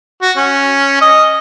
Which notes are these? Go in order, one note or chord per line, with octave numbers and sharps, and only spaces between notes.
F#4
C#4
D#5